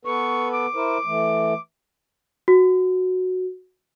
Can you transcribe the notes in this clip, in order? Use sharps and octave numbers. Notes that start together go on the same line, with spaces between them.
B3 A4 B4 C#6
D6
E4 A#4 C5
E3 A3
F#4